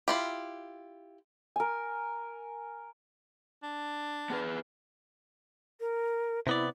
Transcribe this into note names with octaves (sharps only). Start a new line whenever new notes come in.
E4 F4 G4
A#4 G#5
D4
B3 G#4 B4
A#4
C3 B3 E4 D5